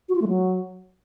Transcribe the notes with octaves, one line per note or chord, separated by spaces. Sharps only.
F#4
F4
A3
F#3